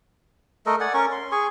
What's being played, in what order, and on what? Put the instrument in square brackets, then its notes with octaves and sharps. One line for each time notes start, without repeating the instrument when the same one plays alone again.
[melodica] A3 A4 A#4 D#5
D5 F#5 G#5
C#4 A#4 C#6
C6
G#4 G#5 C#6